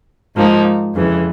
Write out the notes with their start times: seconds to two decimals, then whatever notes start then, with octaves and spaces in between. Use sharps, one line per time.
0.35 G#2 F3 A#3 D#4
0.94 F2 C#3 E3